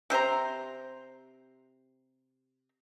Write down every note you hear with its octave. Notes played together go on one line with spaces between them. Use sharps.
C3 G4 C5 A#5